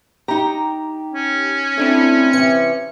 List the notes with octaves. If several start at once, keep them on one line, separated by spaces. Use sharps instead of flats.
D#4 G4 A#5
C#4
A3 C4 D4 E4
C3 E3 C#7